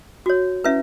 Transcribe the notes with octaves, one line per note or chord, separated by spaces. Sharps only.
F#4 C#5
C#4 E4 B4 E5